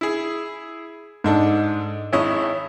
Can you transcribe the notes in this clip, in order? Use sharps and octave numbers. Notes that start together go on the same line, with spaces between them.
E4 G#4
G#2 G#3 D4 A4
G#1 E4 C#5 D#5